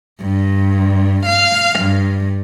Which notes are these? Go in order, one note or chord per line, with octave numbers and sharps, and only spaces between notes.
G2
F5
G2